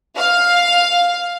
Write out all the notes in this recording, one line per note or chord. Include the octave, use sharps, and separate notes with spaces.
F5